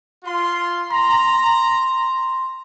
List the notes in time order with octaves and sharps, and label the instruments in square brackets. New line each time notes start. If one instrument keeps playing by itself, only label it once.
[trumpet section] F4 C6
[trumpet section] A#5 [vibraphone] C6